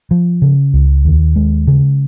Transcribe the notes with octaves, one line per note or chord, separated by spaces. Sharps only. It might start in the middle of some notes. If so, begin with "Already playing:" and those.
F3
C#3
C#2
D#2
G#3
C#3